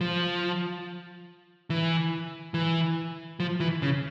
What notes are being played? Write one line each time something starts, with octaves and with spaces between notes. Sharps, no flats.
F3
E3
E3
F3
E3
C#3